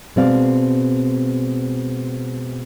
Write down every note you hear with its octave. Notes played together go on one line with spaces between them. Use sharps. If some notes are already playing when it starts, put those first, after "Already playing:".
B2 G#3 C4 D5 F5